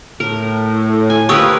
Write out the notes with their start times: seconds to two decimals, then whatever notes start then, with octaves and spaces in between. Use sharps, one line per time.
0.20 A2 A#4
1.10 G#5
1.29 F3 A#3 G4 A#4 B4 C#6 D#6 E6